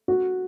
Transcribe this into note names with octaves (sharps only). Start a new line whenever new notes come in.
F#4